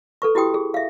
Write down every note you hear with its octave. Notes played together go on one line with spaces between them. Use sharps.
A4 B4 C#6
E4 F#4 G4 G5 D#6
G#4
E5 F5